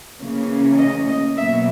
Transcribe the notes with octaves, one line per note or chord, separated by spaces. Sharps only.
C#3 E3 A#3 C#4
D#5
D#5
B2 F#3 A#3 E5